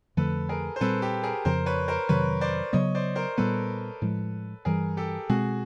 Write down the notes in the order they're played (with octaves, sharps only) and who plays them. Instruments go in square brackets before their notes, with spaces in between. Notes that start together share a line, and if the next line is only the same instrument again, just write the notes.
[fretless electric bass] F2 D3 F3 A3 [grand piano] A4 B4
[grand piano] G#4 A#4
C5
[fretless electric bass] A#2 G3 C4 [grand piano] A4 B4
[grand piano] G4 A4
G#4 A#4
[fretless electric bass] F2 C#3 F3 [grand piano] A#4 C5
[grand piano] B4 C#5
A#4 C5
[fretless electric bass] F2 C3 D#3 F#3 [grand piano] B4 C#5
[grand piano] C5 D5
[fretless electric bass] C#3 F#3 B3 [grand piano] C#5 D#5
[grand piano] C5 D5
A#4 C5
[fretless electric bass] A#2 G3 B3 [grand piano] A4 B4
[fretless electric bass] A2 F3 G#3
[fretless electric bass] G2 E3 G3 [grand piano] G#4 A#4
[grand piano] G4 A4
[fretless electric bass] B2 G#3 C4 [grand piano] F#4 G#4